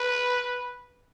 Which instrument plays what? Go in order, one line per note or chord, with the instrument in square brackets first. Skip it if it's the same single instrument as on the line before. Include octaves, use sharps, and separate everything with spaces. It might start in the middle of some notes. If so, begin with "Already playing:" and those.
Already playing: [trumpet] B4